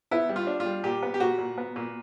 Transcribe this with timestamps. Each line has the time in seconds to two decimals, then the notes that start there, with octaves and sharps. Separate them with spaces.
0.11 B3 E4
0.29 G3
0.36 F4
0.47 D4
0.60 F4
0.65 G3
0.84 A#2 G4
1.02 B3
1.14 G4
1.20 A#2 F#4
1.38 A#2
1.58 B3
1.76 A#2